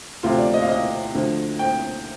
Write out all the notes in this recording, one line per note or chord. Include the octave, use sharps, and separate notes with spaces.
D2 C3 F3 F4
D5
D#5
F5
D#5
D2 D3 F3
G5